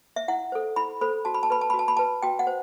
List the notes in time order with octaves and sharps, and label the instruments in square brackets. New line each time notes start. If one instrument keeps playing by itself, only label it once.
[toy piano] E5
E4 F#5
A4 C5
E4 B5
A4 C5 B5
F#4 A5
B5
A5
B4 B5
A5
B5
F#4
A5
B5
B4 A5
F#4 G5
F#5
C5